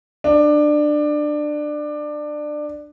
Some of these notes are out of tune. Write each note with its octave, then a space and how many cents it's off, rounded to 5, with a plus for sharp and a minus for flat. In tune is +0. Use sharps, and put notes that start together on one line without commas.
D4 +20